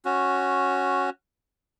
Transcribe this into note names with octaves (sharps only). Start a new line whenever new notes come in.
C#4 F#4